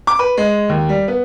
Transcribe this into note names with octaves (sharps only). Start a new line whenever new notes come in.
D6
B4
G#3
D#2
G3
B3